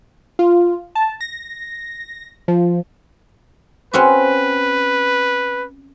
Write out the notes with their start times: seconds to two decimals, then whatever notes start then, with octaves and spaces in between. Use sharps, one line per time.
0.39 F4
0.95 A5
1.21 A#6
2.48 F3
3.94 C4 C#4 F#4 B4